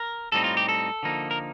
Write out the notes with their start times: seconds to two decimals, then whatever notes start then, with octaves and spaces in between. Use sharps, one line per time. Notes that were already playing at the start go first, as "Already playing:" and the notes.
Already playing: A#4
0.32 A2 G3 C4 D#4 A4
0.44 F4
0.57 G4
0.69 A4
1.03 D3 F3 A#3 D#4
1.31 A#4